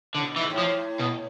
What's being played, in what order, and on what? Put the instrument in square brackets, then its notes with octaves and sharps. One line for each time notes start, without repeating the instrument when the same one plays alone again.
[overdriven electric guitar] D3
[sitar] A2
B2
[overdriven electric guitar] E3
[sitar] G#2
A2
[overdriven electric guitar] F3
B2